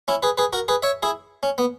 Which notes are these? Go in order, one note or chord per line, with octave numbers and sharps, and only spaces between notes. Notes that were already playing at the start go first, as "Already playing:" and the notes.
C#4 E4
G#4 B4
G#4 B4
F#4 A#4
G#4 B4
C#5 E5
E4 G#4
C#4
B3